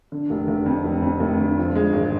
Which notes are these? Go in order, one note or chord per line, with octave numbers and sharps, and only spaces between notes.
D3
F1
F1
F2
F1
F2
F1
D3
F3
G#3
G#1